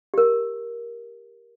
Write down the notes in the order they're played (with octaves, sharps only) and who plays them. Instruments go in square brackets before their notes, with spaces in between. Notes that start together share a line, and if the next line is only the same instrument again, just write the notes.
[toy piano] G4 A#4